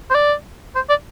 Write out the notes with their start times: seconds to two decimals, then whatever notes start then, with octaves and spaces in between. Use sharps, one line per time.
0.10 C5
0.15 D5
0.76 C5
0.89 D5